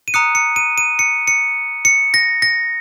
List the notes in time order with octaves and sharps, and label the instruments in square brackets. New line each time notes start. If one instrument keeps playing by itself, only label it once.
[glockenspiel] D#7
A#5 D#6 F#6 C#7
C#7
D#7
D#7
C#7
C#7
C#7
A#6
A#6